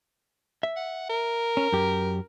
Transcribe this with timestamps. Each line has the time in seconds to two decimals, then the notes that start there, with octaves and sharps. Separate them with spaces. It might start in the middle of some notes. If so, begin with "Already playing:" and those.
0.63 E5
0.76 F#5
1.09 A#4
1.57 C#4
1.73 F#2 G4